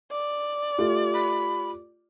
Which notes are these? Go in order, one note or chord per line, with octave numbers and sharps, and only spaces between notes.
D5
A3 F4 G4
B5